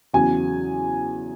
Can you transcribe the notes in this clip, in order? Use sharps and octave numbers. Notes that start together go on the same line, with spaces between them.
E2 C#3 F#3 G#5